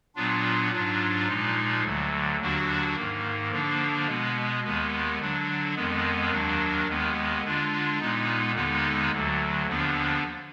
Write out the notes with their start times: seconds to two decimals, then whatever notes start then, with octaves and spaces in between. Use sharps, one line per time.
0.15 A#2 F#3 B3 D4 F4
0.72 G#2 F#3 D4 F4
1.27 A#2 F3 G#3 D#4
1.84 D2 D3 F#3
2.40 D#2 D3 F#3 D4 F#4
2.95 G#2 D#3 A#3
3.51 D3 F3 A#3 D4
4.07 B2 G#3 B3
4.63 D#2 D#3 G#3 B3
5.19 D3 F#3 D4
5.76 F2 D#3 G#3 B3
6.31 D#2 D#3 F#3 D4
6.87 D#2 D#3 G#3 B3
7.43 D3 G#3 D4 F4
8.00 A#2 G#3 B3 D#4
8.55 D#2 D3 G#3 B3 D#4
9.12 D2 D3 F#3
9.67 D#2 D3 F3 B3 D4